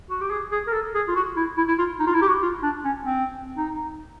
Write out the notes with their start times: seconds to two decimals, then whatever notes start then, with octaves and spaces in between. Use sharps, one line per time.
0.10 F#4
0.21 G4
0.31 G#4
0.52 G#4
0.67 A#4
0.73 A4
0.95 G#4
1.08 F4
1.16 F#4
1.37 E4
1.57 E4
1.68 E4
1.78 F4
2.00 D#4
2.07 F4
2.14 E4
2.22 G4
2.28 F#4
2.42 F4
2.63 D4
2.84 C#4
3.06 C4
3.57 D#4